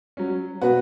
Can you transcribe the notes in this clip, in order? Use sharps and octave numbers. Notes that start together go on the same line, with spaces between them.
F#3 C#4
B2 F#4 B4